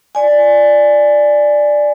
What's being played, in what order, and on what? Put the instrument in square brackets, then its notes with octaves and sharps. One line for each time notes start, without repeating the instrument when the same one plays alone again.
[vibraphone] D5 G#5